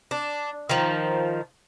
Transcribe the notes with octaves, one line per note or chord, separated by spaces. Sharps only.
D4
D#3 F3